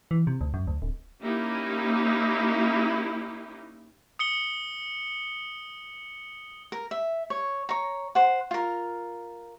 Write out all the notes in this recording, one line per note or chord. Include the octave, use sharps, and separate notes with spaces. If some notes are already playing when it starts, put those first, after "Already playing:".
E3
C3
D2
F#2
D2
D1
A#3 C#4 D#4 E4 G4
D#6 C#7 G7
A#4
E5
C#5
C#5 A#5
C5 F#5
F4 A#4